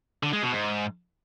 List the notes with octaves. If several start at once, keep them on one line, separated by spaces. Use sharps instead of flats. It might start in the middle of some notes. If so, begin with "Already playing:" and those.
D3
G#3
B2
G#2